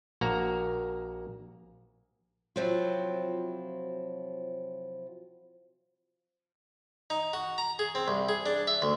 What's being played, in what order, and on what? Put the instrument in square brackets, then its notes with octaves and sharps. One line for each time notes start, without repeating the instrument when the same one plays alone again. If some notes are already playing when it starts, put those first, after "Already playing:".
[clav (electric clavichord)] A#1 A#3 F#4 A#5
[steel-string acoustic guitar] C3 F3 F#3 C4 E4 F4
[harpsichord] D#4
F#4
A#5
G#4
C4
C2
G#4
D4
E5
D2